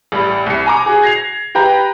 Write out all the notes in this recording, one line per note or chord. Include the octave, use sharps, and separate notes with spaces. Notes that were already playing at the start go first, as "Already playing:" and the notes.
A1 G3 B5
C2 C#7
G#5 A#5 D6
F#4 G#4
G#6 A#6 C7 F7
G4 B4 G5 A#5 B5